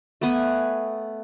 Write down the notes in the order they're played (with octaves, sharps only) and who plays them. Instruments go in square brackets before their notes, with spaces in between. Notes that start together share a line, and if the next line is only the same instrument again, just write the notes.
[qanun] A3 B3 G#5